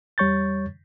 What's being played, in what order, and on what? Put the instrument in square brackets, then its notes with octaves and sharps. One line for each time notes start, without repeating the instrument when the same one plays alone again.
[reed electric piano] E2 G3 C#5 C#6 G6 A6